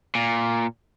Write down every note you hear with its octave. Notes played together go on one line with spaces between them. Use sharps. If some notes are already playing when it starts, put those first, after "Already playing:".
A#2